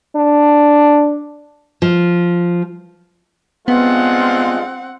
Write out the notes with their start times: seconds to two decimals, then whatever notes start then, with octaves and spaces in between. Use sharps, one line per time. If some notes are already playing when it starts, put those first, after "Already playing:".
0.16 D4
1.82 F3
3.68 G2 G#3 B3 C4 F4 F#5